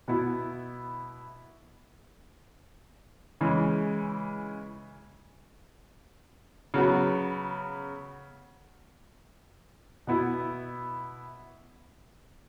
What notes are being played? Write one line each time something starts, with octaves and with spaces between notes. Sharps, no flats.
B2 B3 E4
C#3 E3 G#3
C#3 F#3 B3
B2 B3 E4